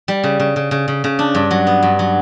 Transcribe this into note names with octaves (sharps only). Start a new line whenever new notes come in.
G3
C#3
C#3
C#3
C#3
C#3
C#3
D4
G2
F#3
B3
G2
F#3